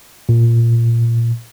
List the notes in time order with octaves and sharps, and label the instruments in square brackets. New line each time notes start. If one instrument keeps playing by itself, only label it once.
[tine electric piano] A#2